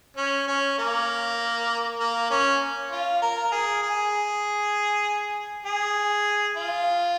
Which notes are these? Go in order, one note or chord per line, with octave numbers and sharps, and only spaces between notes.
C#4
C#4
A#3
A#3
C#4
F4
A#4
G#4
G#4
G#4
F4